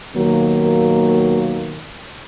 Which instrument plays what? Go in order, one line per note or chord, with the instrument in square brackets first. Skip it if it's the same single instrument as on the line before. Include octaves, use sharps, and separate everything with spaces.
[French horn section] D#2 B2 D#3 F#3 A#3